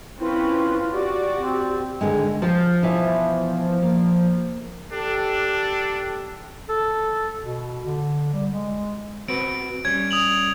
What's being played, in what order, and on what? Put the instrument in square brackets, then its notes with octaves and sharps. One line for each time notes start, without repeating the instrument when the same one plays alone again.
[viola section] C4 C#4 B4 [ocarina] E4 [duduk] F4
[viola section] F#4 D5 [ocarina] G4
[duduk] C4
[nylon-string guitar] D3 D#3 G#3
[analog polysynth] F3 [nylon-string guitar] A5
[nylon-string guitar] B2 E3 E5
A#3
[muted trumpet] D4 [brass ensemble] G4 A4
[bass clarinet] A4
B2
D3
G3
G#3
[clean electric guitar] C4 F#4 B4 [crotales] D7
[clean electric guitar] G3 C#4 [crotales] G#6
[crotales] D#6 F7 F#7